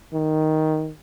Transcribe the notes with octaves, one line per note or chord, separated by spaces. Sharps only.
D#3